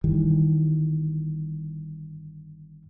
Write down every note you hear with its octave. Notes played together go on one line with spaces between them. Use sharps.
G1 D#3 E3 G3